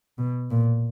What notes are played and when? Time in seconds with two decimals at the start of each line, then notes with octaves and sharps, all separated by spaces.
0.18 B2
0.51 A#2